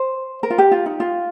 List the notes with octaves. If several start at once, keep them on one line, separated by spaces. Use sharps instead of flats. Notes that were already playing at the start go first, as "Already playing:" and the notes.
Already playing: C5
A#4
F4
G4
F4
D#4
F4